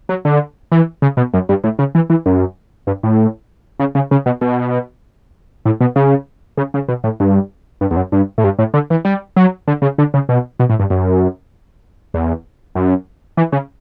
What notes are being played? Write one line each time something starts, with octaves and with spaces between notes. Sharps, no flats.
F#3
D3
E3
C#3
B2
F#2
G2
A2
C#3
E3
E3
F#2
G2
A2
C#3
C#3
C#3
B2
B2
A2
B2
C#3
C#3
C#3
B2
A2
G2
G2
E2
F#2
G2
A2
G2
A2
D3
E3
G3
F#3
D3
C#3
D3
C#3
B2
B2
A2
G2
F#2
E2
F#2
E3
C#3